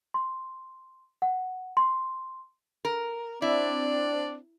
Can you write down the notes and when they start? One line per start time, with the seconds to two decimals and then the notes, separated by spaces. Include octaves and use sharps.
0.14 C6
1.22 F#5
1.77 C6
2.85 A#4
3.42 C4 D4 E4 D5